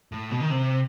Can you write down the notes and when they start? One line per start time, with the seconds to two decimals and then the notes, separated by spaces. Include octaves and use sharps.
0.12 A2
0.31 B2
0.40 D#3
0.50 C3